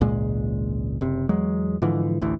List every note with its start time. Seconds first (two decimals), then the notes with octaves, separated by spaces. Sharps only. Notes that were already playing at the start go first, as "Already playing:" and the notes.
0.01 G#1 C#2 A#2 G#3
1.01 F#1 C3
1.29 E2 F#3 G#3
1.82 G#2 D3 E3 F3
2.21 A1 D2 E3